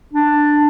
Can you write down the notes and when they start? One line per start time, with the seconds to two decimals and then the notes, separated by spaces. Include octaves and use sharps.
0.13 D4